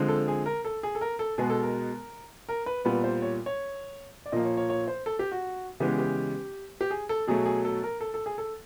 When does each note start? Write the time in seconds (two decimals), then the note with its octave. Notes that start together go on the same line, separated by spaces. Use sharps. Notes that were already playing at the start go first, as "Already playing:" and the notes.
Already playing: D3 F3 G#3 C4
0.08 A4
0.28 G#4
0.46 A#4
0.65 A4
0.83 G#4
0.95 A4
1.01 A#4
1.19 A4
1.38 B2 G#3 B3 G#4
1.50 A4
1.63 A#4
2.49 A#4
2.66 B4
2.85 A#2 G3 B3 B4
3.04 C5
3.22 C#5
3.46 C#5
4.26 D5
4.32 A#2 F3 A#3 D#5
4.45 C#5
4.57 C#5
4.70 C#5
4.88 C5
5.06 A4
5.19 G4
5.32 F#4
5.80 C#3 E3 G#3 B3 G4
5.98 G4
6.81 G4
6.91 G#4
7.09 A4
7.28 B2 F#3 A3 G#4
7.46 G#4
7.65 A4
7.83 A#4
8.01 A4
8.14 A4
8.26 G#4
8.38 A4